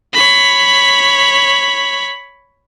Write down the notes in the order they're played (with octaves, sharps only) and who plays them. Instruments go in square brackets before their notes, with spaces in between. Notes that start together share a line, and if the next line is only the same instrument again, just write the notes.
[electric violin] C#5 B5